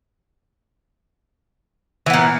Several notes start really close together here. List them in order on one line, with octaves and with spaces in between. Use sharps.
E3 B3 A#2